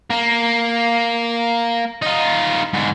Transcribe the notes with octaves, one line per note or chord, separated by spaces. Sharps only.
A#3
D#4 F4
G#2 D3